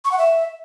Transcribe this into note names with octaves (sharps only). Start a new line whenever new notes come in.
C#6
F#5
E5